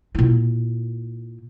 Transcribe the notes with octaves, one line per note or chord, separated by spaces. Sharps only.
A#2 E4